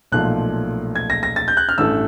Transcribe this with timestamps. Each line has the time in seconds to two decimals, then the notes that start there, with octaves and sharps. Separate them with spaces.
0.12 B1 A#2 F3 A3 F#6
0.96 G#6
1.10 A#6
1.23 A#6
1.36 A6
1.48 G6
1.57 F#6
1.69 F6
1.78 A1 G2 E3 A3 E6